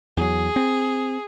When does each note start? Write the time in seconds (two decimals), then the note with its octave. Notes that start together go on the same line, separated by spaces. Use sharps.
0.17 E2 F#3 G#4
0.56 C4